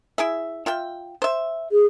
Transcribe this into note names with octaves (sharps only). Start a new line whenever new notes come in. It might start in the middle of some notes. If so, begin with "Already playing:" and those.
E4 G#4 E5
F4 E5 G5
C5 E5
G#4